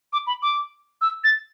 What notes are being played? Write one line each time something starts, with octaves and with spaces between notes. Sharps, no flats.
D6
B5
D6
E6
A6